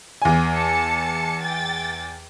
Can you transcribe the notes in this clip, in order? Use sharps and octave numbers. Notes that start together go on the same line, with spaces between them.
E2 G#5
A5 C#7
G5 A6